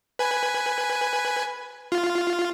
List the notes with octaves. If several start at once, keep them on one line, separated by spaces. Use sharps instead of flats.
B4 G#5
F4